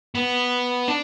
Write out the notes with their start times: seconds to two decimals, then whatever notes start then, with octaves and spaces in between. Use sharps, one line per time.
0.15 B3
0.88 D4